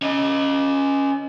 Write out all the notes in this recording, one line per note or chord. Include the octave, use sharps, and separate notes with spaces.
C#4 D#5